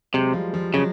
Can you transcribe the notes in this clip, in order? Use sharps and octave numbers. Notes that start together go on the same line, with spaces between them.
C3 F#3 G#3
F3 G3
F3 G3
C#3 F#3 G#3